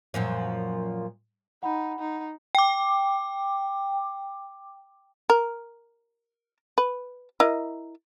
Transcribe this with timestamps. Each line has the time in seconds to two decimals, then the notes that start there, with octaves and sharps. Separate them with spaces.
0.14 F#2 A#2 F3
1.63 D#4 F#5 B5
1.99 D#4
2.55 G5 D6
5.30 A#4
6.78 B4
7.40 E4 A#4 D#5